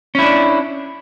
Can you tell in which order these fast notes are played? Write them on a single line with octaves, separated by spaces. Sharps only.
C#4 E4 D4